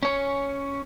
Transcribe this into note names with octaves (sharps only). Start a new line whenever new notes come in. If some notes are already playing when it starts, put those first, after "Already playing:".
C#4 C#5